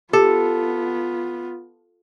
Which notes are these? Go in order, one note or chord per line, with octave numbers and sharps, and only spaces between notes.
B3 F4 G4 A4